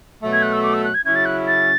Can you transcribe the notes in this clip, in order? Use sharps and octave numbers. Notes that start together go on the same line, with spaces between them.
B2 F#3 A3
G#6
F#6
E6
D6
E6
F#6
G#6
C#3 F#3 C#4 E4 G#6
A6
F#6
A6